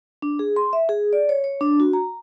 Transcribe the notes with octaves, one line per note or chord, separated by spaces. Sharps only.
D4
G#4
C6
E5
G#4
D5
C#5
C#5
D4
F#4
A#5